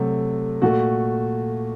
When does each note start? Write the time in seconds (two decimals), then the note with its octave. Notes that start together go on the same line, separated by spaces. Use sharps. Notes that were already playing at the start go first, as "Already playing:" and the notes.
Already playing: C3 F#3 A3
0.62 A#2 A3 F#4